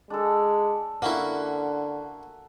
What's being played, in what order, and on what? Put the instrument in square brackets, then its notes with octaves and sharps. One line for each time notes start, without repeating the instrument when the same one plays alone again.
[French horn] G#3 [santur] D4 A4
[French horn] D3 [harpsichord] A#3 C#4 E4 [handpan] F#5